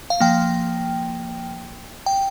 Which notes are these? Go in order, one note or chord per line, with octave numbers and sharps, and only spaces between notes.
F5
F3 A#3 G5
G5